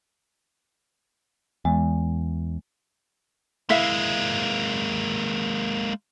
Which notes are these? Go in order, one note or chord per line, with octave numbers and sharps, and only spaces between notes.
E2 G#3
G#3 A#3 E4 E5 F5